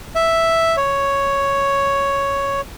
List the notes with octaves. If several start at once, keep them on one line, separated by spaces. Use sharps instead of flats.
E5
C#5